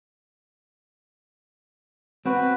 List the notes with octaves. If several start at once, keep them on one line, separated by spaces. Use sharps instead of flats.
C4 F#4 B4